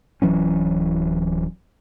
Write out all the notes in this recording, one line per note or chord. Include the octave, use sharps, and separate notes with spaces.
D1 E3 F#3 C#4